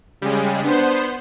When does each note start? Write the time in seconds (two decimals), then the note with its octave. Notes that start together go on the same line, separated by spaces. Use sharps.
0.22 C#3 G3 G#3
0.64 B3 D4 C5